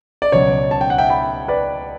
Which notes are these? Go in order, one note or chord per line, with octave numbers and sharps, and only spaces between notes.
D5
C#2 B2 F#3 C#5
A5
G5
F#5
E5 G5
G5 B5
B4 D5